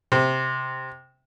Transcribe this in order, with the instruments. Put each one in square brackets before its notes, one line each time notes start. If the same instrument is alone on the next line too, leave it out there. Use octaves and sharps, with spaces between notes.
[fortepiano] C3